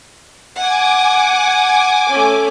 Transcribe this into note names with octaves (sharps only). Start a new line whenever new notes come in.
F#5 G#5 D6
A3 C#4